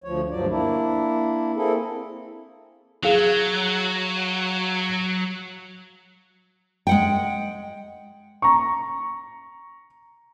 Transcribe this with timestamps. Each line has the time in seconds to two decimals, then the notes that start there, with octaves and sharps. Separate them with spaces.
0.04 D2 F3 C#5
0.31 D2 G2 F3 F#3 D5
0.49 A#3 D4 E4
1.56 A#3 C4 E4 G#4 A4
3.03 F#3 G#4 F5
6.87 G#3 F#5 G5
8.42 A#5 C#6